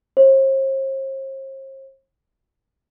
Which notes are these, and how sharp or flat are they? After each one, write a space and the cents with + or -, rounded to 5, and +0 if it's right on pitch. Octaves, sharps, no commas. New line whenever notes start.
C5 +45